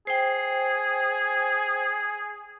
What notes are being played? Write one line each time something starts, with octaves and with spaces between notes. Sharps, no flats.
G#4 C5 G5